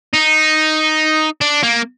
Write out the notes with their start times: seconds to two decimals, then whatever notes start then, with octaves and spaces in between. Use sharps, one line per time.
0.13 D#4
1.41 D4
1.63 A#3